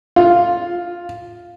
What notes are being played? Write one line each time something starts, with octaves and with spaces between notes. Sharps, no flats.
F4